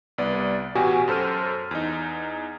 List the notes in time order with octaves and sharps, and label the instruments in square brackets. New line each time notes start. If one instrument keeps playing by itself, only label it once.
[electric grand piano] C2 B3 D5
A1 B2 F#4 G4 G#5
F#2 A4 C5 F6 D#7
E2 D#4